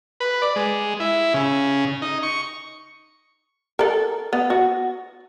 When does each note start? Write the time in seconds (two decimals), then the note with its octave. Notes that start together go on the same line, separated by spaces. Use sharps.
0.20 B4
0.42 D5
0.56 G#3
1.00 E4
1.34 C#3
2.02 D#4
2.23 C#6
3.79 A4 A#4
4.33 B3
4.50 F#4